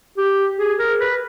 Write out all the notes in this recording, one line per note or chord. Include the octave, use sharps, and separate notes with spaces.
G4
G#4
A#4
B4